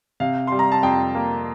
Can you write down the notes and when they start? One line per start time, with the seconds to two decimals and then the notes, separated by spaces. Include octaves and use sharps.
0.20 C3 F5
0.47 G3 C6
0.59 A#5
0.72 A5
0.83 F2 G5
1.15 A#3